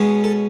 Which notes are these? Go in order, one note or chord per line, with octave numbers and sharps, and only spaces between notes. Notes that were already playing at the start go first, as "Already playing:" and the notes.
Already playing: B2 G#3 C#4
A4